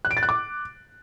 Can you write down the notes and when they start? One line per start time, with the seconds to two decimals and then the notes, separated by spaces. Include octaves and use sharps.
0.05 F#6
0.11 D7
0.17 A6
0.23 F#6
0.29 D6